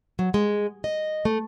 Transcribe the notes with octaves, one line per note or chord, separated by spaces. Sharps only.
F#3
G#3
D#5
A3